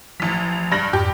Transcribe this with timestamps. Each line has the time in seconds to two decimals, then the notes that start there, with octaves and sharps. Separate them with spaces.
0.20 A1 F3 B6
0.71 G2 A#6 F#7
0.93 F2 G#2 G4